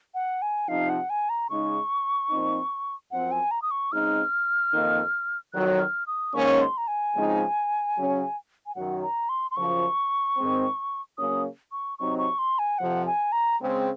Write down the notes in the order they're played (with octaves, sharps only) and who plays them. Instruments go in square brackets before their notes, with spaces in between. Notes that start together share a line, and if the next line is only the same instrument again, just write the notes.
[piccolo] F#5
G#5
[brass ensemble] C3 F3 C4 D#4 [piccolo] F5
[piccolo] F#5
G#5
A#5
[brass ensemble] C#3 G#3 D#4 [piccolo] C#6
[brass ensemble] A#2 F3 C4 D#4
[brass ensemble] F#2 F3 C4 [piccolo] F#5
[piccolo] G#5
A#5
D#6
C#6
[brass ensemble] C#3 G#3 C4 D#4 [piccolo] F6
[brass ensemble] F2 D#3 A#3 D#4
[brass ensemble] F2 D#3 F#3 [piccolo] F#6
[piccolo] F6
D#6
[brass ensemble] G#2 D#3 A#3 C#4 [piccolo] C#6
[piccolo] C6
A#5
G#5
[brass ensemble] C#3 F3 G#3 C4 D#4
C#3 F#3 C#4
[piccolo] G#5
[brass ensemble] F#2 D#3 F#3 [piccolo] F#5
[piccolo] A#5
C6
C6
[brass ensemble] F#2 C#3 F3 [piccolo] C#6
[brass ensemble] G#2 D#3 G#3 C4
[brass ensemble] C#3 F#3 A#3 C#4 [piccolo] D#6
[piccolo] C#6
[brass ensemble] C3 F#3 C4 D#4 [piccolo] C#6
[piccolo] C#6
C6
G#5
[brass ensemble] F2 C3 F3 [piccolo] F#5
[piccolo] G#5
A#5
[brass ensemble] C#3 G#3 C4